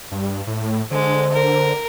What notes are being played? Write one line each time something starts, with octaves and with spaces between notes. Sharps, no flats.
G2
A2
D3 G#3 C5
A#4